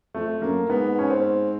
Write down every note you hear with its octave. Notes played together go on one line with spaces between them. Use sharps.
F2 A3
F#2 A#3
G#2 B3
C#4
C4